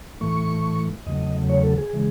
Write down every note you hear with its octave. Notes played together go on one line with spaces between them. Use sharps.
A2 E3 A3 C#6
E2 C#3 F#3 A3 D#5
C#5
A4
G#4
C#3 E3 G#3